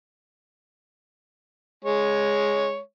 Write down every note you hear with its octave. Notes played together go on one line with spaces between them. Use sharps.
G#3 C#5